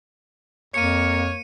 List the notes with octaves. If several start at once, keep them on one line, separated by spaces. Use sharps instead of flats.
F2 A#3 C#5 C#7 D#7